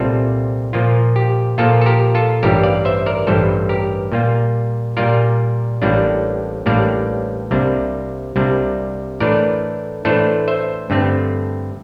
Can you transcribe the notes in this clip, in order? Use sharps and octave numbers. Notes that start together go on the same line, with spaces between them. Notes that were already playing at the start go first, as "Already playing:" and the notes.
Already playing: C2 A#2 G3 C4 F4 A4
A#2 F3 A#3 F4
G4
A#2 F3 A#3 F4 A4
A4
G4 A#4
F4 A4
A1 G2 E3 G3 G4 A#4
D5 F5
C5 E5
A#4 D5
A1 G2 E3 G3 A4 C5
G4 A#4
A#2 G3 A#3 F4
A#2 G3 A#3 F4 A#4 D5
A1 A2 G3 A#3 D4
A1 A2 G3 A#3 D4 D5 F5
C2 C3 G3 A#3 D4
C2 C3 G3 A#3 D4
A2 E3 A3 D4 A#4 D5
A2 E3 A3 D4 A4 C5
C5 E5
G2 D3 A3 C4